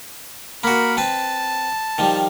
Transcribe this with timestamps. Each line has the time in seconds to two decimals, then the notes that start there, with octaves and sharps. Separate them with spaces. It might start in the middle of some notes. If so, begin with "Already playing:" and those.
0.64 A#3 F#4 A#4 B5
0.97 C4 B4 A5
1.98 D#3 F3 G3